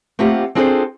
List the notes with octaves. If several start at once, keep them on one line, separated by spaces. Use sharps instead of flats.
A3 A#3 C4 F4 G4 F#5
C4 D4 F4 G#4 A4 C5